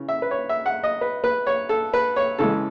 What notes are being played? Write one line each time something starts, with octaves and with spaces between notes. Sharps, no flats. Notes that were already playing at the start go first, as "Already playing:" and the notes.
Already playing: C#3 E3
E5
B4
C#5
E5
F#5
D#5
B4
B4
C#5
A4
B4
C#5
C#3 E3 G#3 A4